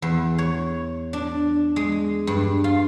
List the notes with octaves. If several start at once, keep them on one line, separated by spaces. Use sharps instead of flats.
E2
C#5
D4
G#3
G2
F4